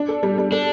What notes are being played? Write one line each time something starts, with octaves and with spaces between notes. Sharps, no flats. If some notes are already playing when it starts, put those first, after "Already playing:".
Already playing: D4
A4
G3
G3
D4 A4